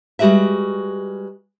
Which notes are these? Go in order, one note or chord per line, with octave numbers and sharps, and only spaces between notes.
G3 G#3 F#4 G4 B4 E5